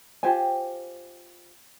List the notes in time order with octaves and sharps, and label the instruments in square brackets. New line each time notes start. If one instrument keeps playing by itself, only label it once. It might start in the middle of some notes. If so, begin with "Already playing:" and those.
[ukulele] F4 G4 C5 G#5